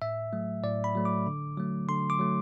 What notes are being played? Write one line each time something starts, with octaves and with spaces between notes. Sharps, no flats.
A2 E5
F#3 A3
A2 D5
B5
F#3 A3
D6
D3
F#3 A3
D3 C6
D6
F#3 A3